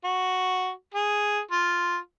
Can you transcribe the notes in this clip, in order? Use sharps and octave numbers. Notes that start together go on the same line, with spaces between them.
F#4
G#4
F4